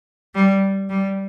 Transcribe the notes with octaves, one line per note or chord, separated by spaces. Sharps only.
G3
G3